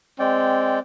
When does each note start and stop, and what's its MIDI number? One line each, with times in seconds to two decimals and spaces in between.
0.19 0.79 56
0.19 0.79 60
0.19 0.79 74
0.19 0.79 79